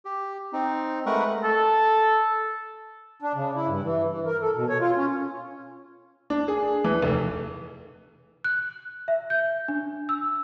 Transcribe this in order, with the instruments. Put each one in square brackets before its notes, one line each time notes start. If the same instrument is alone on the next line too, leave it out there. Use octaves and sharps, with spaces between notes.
[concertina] G4
C4 D#4
G#3 A3 A#4 B4 F#5 C#6
[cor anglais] A4
[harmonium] D4
C#3
E4
G2
E3
E3
A#4
A4
B2
C#5
F4
C#4
[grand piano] D4
G#4
E3
F1
[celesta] F#6
E5
G6
D4
E6